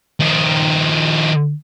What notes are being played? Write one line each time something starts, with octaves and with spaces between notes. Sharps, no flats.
D#3 F3